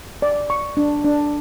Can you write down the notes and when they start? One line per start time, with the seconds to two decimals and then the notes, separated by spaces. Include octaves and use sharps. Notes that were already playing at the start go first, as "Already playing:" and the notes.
0.22 D5
0.50 C#6
0.77 D4
1.05 D4